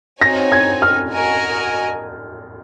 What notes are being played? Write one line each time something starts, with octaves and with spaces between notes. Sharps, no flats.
C4 D#4 F#4 C#5 G#5 A#6
G#6
F6
F#4 A#4 D#5 G#5